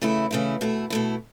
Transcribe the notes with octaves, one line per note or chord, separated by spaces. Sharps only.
C#3 E3 A3 E4
C#3 E3 A3 E4
B2 A3 E4
B2 A3 E4